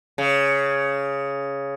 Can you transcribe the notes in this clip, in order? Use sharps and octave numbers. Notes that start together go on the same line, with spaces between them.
C#3